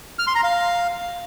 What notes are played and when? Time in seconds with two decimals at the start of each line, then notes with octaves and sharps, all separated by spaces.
0.19 F6
0.27 C6
0.35 A#5
0.43 F5